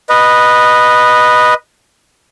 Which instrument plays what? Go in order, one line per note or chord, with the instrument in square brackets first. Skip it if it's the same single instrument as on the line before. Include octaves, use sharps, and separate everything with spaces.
[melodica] B4 D#5